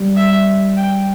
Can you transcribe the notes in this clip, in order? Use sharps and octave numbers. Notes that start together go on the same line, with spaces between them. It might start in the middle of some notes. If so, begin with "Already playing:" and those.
Already playing: G3
E5
G5